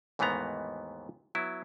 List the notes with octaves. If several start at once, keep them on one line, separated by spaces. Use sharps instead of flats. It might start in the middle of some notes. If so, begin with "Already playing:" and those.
D#2 G#2 E3 A3 B3 A#5
F#3 B3 E4